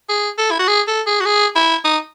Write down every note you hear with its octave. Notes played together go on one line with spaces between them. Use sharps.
G#4
A4
E4
F#4
G#4
A4
G#4
F#4
G#4
E4
D#4